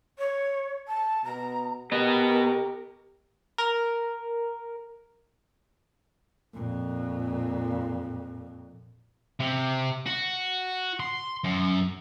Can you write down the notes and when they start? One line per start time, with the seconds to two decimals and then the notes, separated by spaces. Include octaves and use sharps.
0.18 C#5
0.87 A5
1.24 B2 A#5
1.92 B3 G4 A#4 D#5
3.58 A#4
6.54 F2 A#2
9.40 C3
10.06 F#4
11.00 C6
11.44 F#2